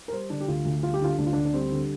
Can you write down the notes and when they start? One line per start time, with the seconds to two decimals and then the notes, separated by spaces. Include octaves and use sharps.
0.08 A#4
0.12 G3 C5
0.30 D3 D4
0.41 G4
0.48 D2 F4
0.65 D2
0.83 G3 F4
0.94 G4
1.01 D3 F4
1.18 D2 D4
1.26 F4
1.33 D2 D4
1.45 D4
1.53 G3 C4
1.72 D3